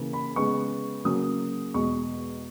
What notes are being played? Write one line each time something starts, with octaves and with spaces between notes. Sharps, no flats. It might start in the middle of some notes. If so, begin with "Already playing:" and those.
Already playing: C#3 E3 A#3
B5
C#3 G#3 B3 C#6
C#3 F#3 A#3 C#4 D#6
E2 B2 G#3 C#6